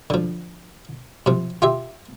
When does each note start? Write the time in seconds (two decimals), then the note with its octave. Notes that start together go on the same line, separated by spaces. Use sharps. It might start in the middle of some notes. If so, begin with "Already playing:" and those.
0.10 D3 F3
1.26 C3 F3
1.62 F4 G4 E5